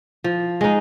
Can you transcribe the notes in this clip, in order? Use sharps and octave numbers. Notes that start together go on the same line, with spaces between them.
F3
G#3 D#4